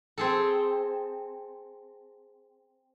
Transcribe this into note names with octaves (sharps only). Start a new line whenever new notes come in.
C4 G#4 A4